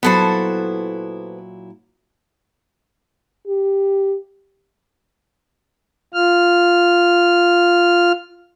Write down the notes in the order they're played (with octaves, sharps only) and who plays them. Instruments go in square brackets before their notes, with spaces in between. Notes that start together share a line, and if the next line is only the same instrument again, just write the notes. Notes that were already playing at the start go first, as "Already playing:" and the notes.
[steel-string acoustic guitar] A#2 F#3 E4 [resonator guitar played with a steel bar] B3 A4 C5
[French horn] G4
[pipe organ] F4 F6